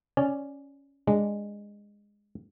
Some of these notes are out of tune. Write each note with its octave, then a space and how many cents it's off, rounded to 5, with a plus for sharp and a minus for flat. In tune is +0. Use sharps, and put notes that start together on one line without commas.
C#4 +0 D5 +0 G#5 +30
G#3 -15 D4 +0